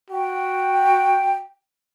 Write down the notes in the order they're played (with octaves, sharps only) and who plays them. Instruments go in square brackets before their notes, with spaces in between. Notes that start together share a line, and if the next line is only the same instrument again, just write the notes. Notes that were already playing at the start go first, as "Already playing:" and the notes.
[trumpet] F#4 [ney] G5